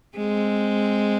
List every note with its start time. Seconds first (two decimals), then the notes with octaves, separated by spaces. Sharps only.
0.17 G#3 C4